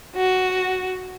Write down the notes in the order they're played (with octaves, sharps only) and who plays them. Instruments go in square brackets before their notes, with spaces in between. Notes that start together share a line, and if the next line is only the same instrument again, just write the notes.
[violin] F#4